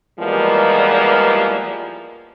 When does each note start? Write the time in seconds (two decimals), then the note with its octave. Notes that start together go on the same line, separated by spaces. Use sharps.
0.20 E2 E3 F3 G3 G#3 A#3